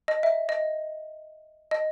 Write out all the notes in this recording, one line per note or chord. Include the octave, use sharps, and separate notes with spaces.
D#5
E5
D#5
D#5